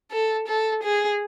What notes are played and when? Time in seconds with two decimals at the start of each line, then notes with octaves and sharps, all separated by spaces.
0.11 A4
0.48 A4
0.83 G#4